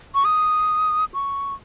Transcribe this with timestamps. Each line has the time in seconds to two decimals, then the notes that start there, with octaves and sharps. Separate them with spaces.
0.15 C#6
0.25 D#6
1.14 C#6